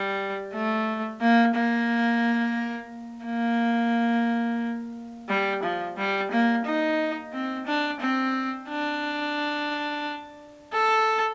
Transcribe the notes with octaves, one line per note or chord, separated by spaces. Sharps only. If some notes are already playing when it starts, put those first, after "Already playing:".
Already playing: G3
A3
A#3
A#3
A#3
G3
F3
G3
A#3
D#4
C4
D4
C4
D4
A4